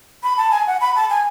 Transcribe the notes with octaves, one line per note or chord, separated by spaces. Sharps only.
B5
A5
G#5
F#5
B5
A5
G#5